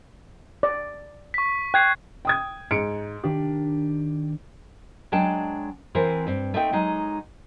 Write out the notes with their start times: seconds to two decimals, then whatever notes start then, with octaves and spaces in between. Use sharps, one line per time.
0.63 D5
1.34 C#6 B6
1.74 G5 F#6 G#6 C7
2.25 G5 D#6 G#6
2.71 G#2 C#7 D7
3.24 D#3 D4 G4
5.12 F#3 G#3 D4 G5 A5
5.95 E3 C4 E4 A#4 C5
6.27 G2 C4
6.54 A3 C4 D#4 D#5 G5
6.73 F#3 G#3 D#4